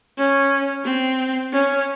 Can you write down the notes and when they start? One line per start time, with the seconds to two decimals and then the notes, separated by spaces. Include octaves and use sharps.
0.18 C#4
0.85 C4
1.52 C#4